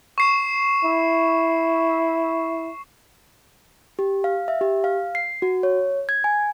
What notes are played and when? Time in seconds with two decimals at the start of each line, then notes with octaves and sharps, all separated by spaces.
0.18 C#6 C7 E7
0.84 E4
3.99 G4
4.24 F5
4.48 E5
4.61 G4
4.84 F5
5.15 C7
5.42 F#4
5.63 C#5
6.09 G#6
6.24 G#5